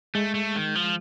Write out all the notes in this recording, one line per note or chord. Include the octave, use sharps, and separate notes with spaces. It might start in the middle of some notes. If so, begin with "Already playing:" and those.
G#3 A3
A3
D#3
F3